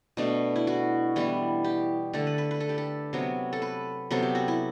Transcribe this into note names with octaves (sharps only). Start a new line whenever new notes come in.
B2 A3 D4
E4
F#4
E3 G3 B3
G4
D3 A3 A4
B4
B4
B4
A4
G4
A4
C3 F#3 B3
A4
B4
C3 F#3 B3 A4
G4
F#4
E4